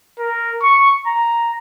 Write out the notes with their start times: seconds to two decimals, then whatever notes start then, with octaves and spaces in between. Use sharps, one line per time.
0.19 A#4
0.63 C#6
1.07 A#5